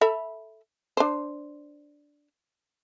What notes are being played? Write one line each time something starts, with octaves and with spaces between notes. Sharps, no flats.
A4 E5 B5
D4 C5